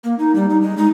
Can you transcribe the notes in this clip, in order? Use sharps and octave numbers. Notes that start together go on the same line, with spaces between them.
A#3
D#4
G3
D#4
G#3
D#4